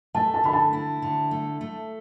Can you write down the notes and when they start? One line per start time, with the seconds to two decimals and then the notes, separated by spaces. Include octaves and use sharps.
0.14 A3 A5
0.34 A5
0.44 D3 B5
0.53 A5
0.73 E4
1.02 D3
1.31 A3
1.61 A3